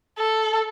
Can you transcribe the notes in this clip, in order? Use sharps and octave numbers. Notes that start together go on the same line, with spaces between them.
A4